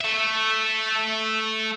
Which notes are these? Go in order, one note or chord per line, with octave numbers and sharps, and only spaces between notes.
A3 E5